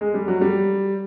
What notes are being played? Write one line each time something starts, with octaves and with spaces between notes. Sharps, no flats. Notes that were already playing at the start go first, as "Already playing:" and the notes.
G#3
G3
F#3
G3